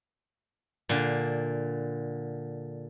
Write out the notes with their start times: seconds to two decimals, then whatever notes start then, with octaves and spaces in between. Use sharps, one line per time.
0.89 A#2 D3